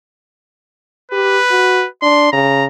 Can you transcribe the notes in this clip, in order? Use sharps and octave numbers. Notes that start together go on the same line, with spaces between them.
G4 B4
F#4
D4 C6
C#3 A#5